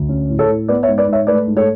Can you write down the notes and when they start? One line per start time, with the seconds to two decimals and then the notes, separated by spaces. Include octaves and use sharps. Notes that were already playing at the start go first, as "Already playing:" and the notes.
Already playing: D2
0.09 C#4
0.29 A2
0.39 A4 C#5
0.48 A2
0.68 B3 B4 D5
0.83 C#5 E5
0.88 G#2
0.98 B4 D5
1.07 G#2
1.13 C#5 E5
1.27 A3 B4 D5
1.47 G#2
1.57 A4 C#5